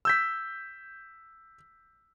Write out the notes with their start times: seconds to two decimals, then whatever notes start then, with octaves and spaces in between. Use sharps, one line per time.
0.05 E6 G6 B6